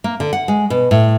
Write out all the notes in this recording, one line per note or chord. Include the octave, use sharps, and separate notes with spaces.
A#3
D3
F#5
G#3
B2
A2